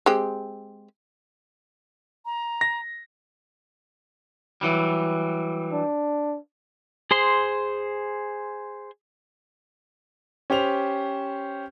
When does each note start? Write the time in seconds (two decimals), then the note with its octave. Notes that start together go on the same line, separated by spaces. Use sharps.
0.06 G#3 C4 G4
2.25 A#5
2.61 A#6
4.61 E3 F#3 G3
5.72 D4
7.11 G#4 C5 C6
10.50 C#4 G4 C5 F7